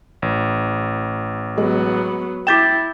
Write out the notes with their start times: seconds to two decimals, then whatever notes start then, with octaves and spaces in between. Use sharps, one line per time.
0.22 A1
1.58 F#3 G#3 B3
2.47 E4 G5 D6 G6 A6 B6 E7